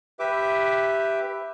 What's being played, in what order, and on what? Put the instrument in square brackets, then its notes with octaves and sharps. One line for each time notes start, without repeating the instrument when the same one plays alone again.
[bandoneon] G4 B4 E5 D6